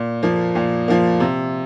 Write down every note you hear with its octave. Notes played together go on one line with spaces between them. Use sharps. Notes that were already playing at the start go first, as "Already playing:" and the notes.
Already playing: A#2
F3 A#3
A#2
F3 A#3
C3